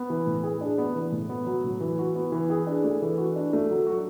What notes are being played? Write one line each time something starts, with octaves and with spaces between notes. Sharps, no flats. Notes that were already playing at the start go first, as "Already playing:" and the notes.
Already playing: B3
E3
A2
G#4
D4
B3
E3
A2
B3
F#3
A2
E3
F#4
B3
E3
G#4
D4
A3
E3
F#4
D4
A3
F#3
F#4